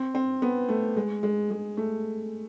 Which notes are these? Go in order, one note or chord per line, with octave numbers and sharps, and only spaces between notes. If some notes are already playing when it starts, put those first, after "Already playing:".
Already playing: C4
C4
B3
A3
G#3
G#3
G#3
A3